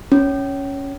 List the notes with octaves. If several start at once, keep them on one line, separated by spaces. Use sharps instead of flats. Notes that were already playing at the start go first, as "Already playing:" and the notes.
C#4